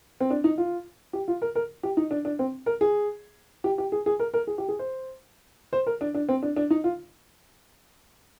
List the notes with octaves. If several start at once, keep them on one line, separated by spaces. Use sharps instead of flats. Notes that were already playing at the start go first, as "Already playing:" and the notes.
C4
D4
D#4
F4
G4
F4
A#4
A#4
G4
D#4
D4
D4
C4
A#4
G#4
G4
G4
G#4
G#4
A#4
A#4
G#4
G4
G#4
C5
C5
A#4
D4
D4
C4
D4
D4
D#4
F4